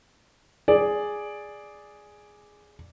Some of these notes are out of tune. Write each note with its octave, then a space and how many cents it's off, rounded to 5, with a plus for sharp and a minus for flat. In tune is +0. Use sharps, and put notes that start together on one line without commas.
G#4 +0 D5 +0